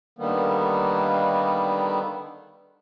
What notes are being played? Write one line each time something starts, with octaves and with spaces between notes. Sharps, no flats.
D3 D#3 G3 A#3 B3